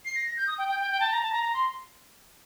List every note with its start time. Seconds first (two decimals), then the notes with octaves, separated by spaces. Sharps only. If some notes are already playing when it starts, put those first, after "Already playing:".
0.05 C7
0.15 A#6
0.26 A#6
0.37 G6
0.47 D#6
0.58 G5
0.68 G5
0.80 G5
0.90 G5
1.00 A5
1.11 A#5
1.22 A5
1.32 A#5
1.43 A#5
1.54 C6